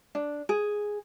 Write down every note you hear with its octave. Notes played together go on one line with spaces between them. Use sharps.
D4
G#4